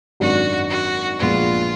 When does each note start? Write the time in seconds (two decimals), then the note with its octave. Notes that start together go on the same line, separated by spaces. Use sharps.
0.20 G#1 F#2 D#3 F#3 D4 F#4
0.70 F#4
1.19 A#1 A#2 G#3 B3 D4 F4